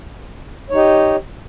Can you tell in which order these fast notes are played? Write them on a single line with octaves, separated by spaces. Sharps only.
C#5 D#4 G4 D#5